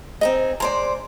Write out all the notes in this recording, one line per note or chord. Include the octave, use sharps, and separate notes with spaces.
C4 D#4 G#4 D#5
G#3 C5 D5 A#5